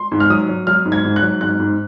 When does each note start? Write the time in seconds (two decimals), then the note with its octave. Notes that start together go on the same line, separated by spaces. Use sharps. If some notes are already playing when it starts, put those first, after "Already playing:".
Already playing: C6
0.12 G#2
0.20 F6
0.30 F#3 D#6
0.49 F#3
0.67 F#3 F6
0.86 G#2
0.92 G#6
1.04 G#2
1.16 F#6
1.22 F#3
1.41 G#2 F#6
1.60 G#2